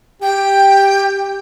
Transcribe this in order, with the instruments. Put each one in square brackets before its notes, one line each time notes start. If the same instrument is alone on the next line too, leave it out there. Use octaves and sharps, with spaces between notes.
[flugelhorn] G4 [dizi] G5